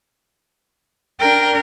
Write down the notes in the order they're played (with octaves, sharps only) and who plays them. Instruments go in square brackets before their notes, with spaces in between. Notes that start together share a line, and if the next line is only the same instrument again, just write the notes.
[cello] D4 A#4 [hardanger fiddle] G5